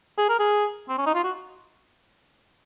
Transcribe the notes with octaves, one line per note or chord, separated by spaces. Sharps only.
G#4
A#4
G#4
C4
C#4
D#4
F4
F#4